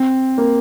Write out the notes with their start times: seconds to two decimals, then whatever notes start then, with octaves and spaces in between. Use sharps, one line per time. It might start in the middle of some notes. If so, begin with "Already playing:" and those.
Already playing: C4
0.38 A#3